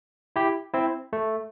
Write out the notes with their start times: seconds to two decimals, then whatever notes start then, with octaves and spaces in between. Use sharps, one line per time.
0.36 E4 G4
0.73 C4 E4
1.13 A3